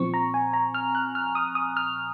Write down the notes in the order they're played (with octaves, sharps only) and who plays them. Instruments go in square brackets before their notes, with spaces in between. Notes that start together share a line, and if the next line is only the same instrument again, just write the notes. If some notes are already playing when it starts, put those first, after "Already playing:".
Already playing: [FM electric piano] A#2 F3 C4 C#6
A#5
G#5
A#5
F6
F#6
F6
D#6
D#6
F6